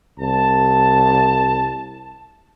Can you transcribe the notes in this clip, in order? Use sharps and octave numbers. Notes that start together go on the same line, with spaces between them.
C2 A5